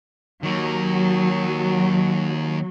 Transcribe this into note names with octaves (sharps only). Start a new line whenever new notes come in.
D#3 F#3 A#3